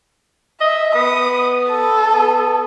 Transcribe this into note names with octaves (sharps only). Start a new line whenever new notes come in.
D#5 E5
B3 D#6
A4
B3